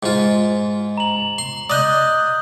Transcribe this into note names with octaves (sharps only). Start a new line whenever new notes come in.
G#2 F4
A#5 F#7
C6
D5 D#5 D#6 F#6 G6